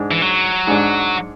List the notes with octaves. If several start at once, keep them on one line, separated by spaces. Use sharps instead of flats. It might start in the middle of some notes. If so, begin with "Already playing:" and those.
Already playing: G#2 G#3 D4
E3
F#3
G#2 G#3 D4